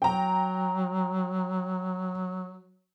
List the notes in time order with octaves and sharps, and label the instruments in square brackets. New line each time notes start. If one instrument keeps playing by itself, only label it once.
[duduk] F#3 [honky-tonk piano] G5 A#5